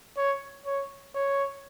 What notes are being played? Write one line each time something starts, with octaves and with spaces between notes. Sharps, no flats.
C#5
C#5
C#5